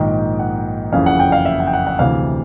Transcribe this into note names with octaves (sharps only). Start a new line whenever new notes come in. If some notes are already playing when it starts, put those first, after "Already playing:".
Already playing: A#1 G#2 D#3 G5
F#5
F#1 F2 C#3 E3 F5
F#5
G5
F5
E5
F#5
G5
F#5
F#5
D2 C3 E3 F5